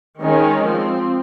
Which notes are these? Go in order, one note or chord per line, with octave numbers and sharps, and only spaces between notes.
D#3 G#3 C#4
F3 C4